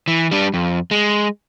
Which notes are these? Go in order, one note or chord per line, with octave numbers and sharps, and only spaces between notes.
E3
G3 D4
F2
G#3